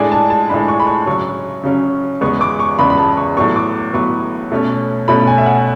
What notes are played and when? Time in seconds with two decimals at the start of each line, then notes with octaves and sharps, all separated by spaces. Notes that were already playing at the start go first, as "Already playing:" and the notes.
Already playing: A2 G#3 D4 G#5
0.12 A5
0.30 A5
0.49 A2 G#3 D4 B5
0.68 C#6
0.80 B5
0.87 C#6
1.06 C#3 F#3 C#4 C#6
1.63 C#3 F#3 C#4
2.21 E2 C#3 G#3 B3 C#6
2.41 D6
2.59 C#6
2.79 E2 C#3 G#3 B3 B5
2.90 B5
2.98 A5
3.17 C#6
3.37 A2 F#3 B3 C#6
3.56 D6
3.94 A2 F#3 B3 C#6
4.52 B2 A3 C#4
5.08 B2 A3 C#4 B5
5.27 G#5
5.38 E5
5.46 F#5